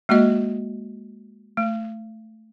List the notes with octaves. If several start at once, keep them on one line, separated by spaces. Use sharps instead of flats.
G#3 A#3 F#4 D#5
A3